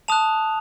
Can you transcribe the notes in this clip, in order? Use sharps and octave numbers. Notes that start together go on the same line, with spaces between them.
A5 D#6 F#6 F7